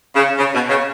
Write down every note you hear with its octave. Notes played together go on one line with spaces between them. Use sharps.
C#3
C#3
B2
C#3